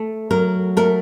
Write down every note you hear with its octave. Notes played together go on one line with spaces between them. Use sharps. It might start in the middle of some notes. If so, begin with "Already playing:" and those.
Already playing: A3
F#3 A#4
A3 A#4